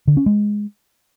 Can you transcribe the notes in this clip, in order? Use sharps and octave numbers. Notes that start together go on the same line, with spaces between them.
D3
C#4
G#3